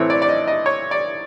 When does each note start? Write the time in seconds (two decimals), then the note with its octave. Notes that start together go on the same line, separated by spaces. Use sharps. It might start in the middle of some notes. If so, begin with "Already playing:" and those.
Already playing: A2 E3 A3 C4 C#5
0.10 D5
0.22 D5
0.29 D#5
0.48 D#5
0.66 C#5
0.91 D5